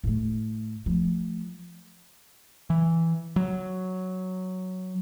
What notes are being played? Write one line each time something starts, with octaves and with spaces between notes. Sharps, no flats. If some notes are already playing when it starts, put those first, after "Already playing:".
A2 A3
F3 A3
E3
F#3